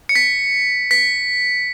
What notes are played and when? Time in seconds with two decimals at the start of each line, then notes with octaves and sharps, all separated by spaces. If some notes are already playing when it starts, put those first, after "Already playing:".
0.09 C#7
0.15 B6
0.91 B6